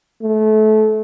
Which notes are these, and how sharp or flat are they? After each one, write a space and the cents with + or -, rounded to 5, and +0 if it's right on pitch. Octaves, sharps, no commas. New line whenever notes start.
A3 -25